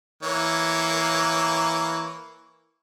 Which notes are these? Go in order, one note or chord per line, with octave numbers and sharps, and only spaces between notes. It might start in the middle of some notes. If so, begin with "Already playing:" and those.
E3 A#3 C#5